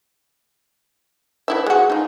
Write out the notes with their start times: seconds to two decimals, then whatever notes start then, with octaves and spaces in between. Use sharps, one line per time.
1.48 E3 E4 E5
1.66 G#3 F#4
1.90 D#4 F4